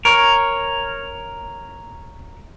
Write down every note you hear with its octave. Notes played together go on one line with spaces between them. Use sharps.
A#4 C#5